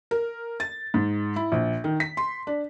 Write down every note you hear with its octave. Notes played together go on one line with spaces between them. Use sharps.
A#4
A6
G#2
E4
A#1
D#3
B6
C6
D4